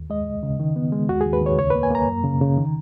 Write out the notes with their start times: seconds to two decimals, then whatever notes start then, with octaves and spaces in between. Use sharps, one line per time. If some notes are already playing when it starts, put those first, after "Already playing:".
Already playing: D#2
0.10 G#3 D#5
0.26 C#2
0.43 C#3
0.60 D#3
0.76 B3
0.92 G#3
1.09 D#2 F#4
1.21 D#2 G#4
1.33 B4
1.42 D#2 C#5
1.58 C#2 C#5
1.70 A#3 B4
1.83 G#5
1.91 A#3 A#5
2.08 F#2
2.24 C#3
2.41 C#3
2.58 D#3